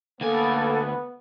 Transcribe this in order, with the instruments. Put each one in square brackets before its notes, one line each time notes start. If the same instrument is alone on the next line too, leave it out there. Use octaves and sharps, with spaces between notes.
[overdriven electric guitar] D2 G#5 [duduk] A#3 [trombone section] B3 [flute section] A4